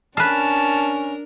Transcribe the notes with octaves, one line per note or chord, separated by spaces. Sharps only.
C#4 D4 A#4 B4 F5 A5